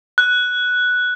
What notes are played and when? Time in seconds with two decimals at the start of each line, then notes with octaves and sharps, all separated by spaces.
0.18 F#6